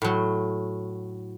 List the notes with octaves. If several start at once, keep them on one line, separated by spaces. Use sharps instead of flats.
A2 F#3